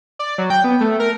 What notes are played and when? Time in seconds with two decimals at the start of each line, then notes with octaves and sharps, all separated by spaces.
0.19 D5
0.38 F#3
0.50 G5
0.64 B3
0.81 A3
1.00 A#4